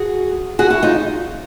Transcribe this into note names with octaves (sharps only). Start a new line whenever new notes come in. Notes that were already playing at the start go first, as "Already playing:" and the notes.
Already playing: F#4 G#4
F#4 G#4
E4 F#4
D#4 F4